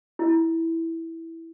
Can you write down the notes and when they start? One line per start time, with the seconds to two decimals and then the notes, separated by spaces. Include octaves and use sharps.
0.19 E4